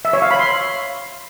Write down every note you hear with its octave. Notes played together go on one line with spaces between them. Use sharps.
E5
C#5
F5
B5
C6